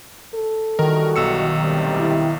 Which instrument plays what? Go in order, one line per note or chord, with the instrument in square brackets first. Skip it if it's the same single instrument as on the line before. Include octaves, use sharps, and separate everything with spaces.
[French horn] A4
[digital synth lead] D#3 [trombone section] E3 G3 F#4 [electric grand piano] A#4
[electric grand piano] B1 E6 C#7
[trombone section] D2 C3 G3
[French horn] E4